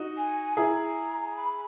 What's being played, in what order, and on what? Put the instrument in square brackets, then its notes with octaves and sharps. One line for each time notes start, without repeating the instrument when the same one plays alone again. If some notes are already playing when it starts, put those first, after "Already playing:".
Already playing: [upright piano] D#4 F#4
[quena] G#5
[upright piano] E4 G#4 [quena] A#5
[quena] B5